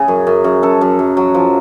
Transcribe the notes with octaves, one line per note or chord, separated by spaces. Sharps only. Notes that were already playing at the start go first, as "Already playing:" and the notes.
Already playing: C#3 G#4
F#2
F#2
F#2
F#2 A4
F#2
F#2
F#3
F3